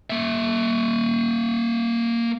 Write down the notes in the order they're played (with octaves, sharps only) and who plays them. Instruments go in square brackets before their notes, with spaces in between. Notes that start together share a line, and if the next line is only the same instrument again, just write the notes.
[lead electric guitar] A#3 E5